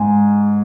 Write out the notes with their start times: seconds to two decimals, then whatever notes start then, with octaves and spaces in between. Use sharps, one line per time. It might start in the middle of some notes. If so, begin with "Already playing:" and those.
Already playing: G#2 G#5